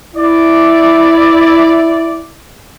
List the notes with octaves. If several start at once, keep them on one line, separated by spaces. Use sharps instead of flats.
E4 D5